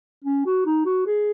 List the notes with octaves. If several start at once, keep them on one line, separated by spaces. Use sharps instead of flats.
C#4
F#4
D#4
F#4
G#4